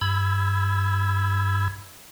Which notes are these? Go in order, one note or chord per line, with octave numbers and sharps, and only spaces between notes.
G2 B5 E6 G#6